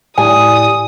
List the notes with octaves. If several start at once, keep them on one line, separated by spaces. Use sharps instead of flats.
A2 E4 G4 D5 G#5 D#6